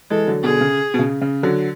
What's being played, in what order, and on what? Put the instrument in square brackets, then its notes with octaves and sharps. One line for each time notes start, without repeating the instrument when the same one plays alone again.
[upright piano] E3 G#3 [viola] A4
[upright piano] D3 F#3
[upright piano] B2 D3 [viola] G#4
[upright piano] C#3
B2
C#3
C#3
D3 F#3